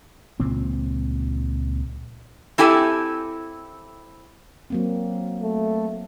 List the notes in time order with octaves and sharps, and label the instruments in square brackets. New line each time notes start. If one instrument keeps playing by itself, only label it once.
[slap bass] C#2 A#2 F3 C4
[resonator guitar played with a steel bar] C4 E4 G4 A4 G#5
[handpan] F#3 A#3 C4
[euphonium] A3